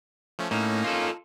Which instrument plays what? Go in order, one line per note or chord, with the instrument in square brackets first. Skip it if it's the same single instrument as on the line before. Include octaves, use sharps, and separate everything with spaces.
[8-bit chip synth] F3 A3 C#4
[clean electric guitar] A2 [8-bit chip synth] A#3 C#4 D#4
[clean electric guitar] F4 A4